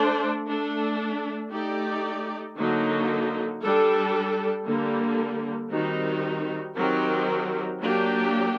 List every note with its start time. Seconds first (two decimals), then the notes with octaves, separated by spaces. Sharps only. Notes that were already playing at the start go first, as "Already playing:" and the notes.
Already playing: A3 D4 A4 C5
0.48 A3 D4 A4
1.52 A3 D#4 G4 D5
2.57 D3 F#3 A#3 D#4
3.63 G3 D4 A4
4.67 D3 G3 A#3
5.71 D#3 G3 C4 D#4 F#4
6.76 D#3 F#3 C4 G4 A#4
7.82 F#3 A#3 D4 G4